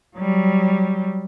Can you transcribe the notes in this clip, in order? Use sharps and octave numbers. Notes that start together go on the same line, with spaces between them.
F#3 G3